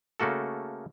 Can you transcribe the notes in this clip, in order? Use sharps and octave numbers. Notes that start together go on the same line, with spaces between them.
C#3 A3 A#3 F#4 A4